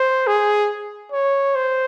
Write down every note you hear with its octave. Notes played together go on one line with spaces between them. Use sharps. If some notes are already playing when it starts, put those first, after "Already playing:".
Already playing: C5
G#4
C#5
C5